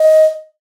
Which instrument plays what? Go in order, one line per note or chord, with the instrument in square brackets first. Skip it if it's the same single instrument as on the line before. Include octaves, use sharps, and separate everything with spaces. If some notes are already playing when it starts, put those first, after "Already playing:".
Already playing: [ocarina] D#5